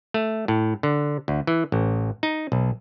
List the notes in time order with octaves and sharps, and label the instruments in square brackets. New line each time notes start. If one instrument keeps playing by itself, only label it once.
[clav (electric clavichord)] A3
A2
D3
D2
E3
A1
D#4
B1